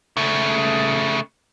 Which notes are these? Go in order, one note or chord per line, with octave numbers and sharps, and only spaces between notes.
C#3 A3